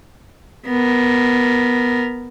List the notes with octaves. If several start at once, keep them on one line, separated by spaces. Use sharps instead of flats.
B3 A#4